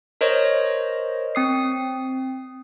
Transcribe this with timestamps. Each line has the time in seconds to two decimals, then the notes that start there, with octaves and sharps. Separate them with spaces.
0.21 A#4 C5 C#5 D#5
1.35 C4 D#6 C7